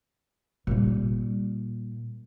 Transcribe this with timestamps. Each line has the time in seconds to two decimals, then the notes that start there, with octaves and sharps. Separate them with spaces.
0.67 A#2 G3